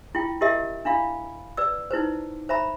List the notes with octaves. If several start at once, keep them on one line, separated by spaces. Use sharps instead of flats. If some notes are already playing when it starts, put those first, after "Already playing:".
E4 F4 G5
E4 G4 A#4 D#5 E5
D4 E4 F5 B5
B4 D5 E6
D#4 E4 B4 C5
C5 E5 A#5 B5